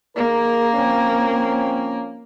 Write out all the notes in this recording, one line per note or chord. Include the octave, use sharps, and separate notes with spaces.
D#3 A#3 G#4 A#4
F3 C4 C#4